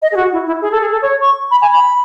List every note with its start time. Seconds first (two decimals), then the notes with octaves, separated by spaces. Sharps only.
0.02 D#5
0.12 G#4
0.16 F#4
0.32 E4
0.47 E4
0.61 G#4
0.71 A4
0.81 G#4
0.92 A4
1.02 C#5
1.21 C#6
1.51 B5
1.62 G#5
1.72 B5